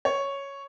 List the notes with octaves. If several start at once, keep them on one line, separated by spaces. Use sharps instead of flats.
C#5